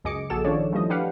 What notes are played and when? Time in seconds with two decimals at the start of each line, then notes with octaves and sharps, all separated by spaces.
0.04 C#2 F#2 G#4 D#5 D6 C#7
0.30 A#1 F#4 G#4 A4 E7
0.45 D#3 F3 C#4 D4 C#5 D5
0.72 E3 F3 G3 A3 D#5
0.90 D4 G4 B4 F5 F#5